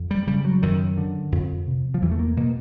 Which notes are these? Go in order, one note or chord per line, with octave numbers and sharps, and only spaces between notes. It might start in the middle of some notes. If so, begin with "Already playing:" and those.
Already playing: F2
G3
C#3 G3
F#3
F#2 D#3
D3
F2
C3
F3
E2 E3
A3
A#3
B2 A#3